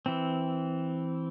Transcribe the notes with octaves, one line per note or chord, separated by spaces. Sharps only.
E3 C4